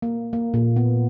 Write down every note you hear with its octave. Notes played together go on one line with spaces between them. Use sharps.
A#3
A#3
A#2
B3